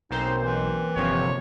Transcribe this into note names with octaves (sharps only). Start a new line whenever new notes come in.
B1 A#3 C4 C#4 D#4 C5
E3 G4
G1 C3 F3 C#5